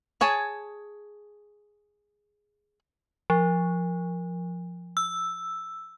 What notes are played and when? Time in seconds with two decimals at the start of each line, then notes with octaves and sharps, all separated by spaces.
0.21 G#4 C#5 G#5 A5
3.30 F3
4.97 E6